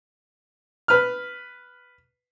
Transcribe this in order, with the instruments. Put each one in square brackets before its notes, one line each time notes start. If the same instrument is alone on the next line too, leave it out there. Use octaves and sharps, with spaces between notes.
[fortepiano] B4 F6